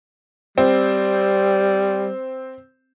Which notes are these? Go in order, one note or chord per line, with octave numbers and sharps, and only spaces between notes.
G3 C4